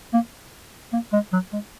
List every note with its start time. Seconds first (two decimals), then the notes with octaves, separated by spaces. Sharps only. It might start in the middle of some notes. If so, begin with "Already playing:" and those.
0.13 A#3
0.93 A#3
1.12 G#3
1.32 F#3
1.52 G#3